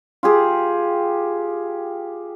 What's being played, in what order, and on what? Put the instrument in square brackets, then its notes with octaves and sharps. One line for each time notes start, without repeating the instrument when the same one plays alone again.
[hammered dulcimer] F4 G4 G#4